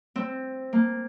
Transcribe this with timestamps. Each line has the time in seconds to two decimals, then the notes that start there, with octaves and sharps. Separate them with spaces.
0.16 C4
0.73 A#3